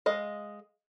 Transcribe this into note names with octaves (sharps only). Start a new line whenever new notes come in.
G#3 D#5 F5